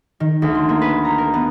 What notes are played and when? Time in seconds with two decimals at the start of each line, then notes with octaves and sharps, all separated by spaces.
0.20 D#3
0.42 D2
0.55 C6
0.69 A#3
0.82 B4
1.04 A#5
1.18 A#4
1.34 B3